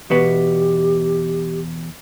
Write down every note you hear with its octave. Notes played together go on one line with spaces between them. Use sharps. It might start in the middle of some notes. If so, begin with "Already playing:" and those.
E2 B2 B3 G4